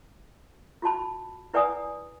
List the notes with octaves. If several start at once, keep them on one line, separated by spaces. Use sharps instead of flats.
F4 F#4 A5 B5
E4 B4 D5 F#5 G#5 D#6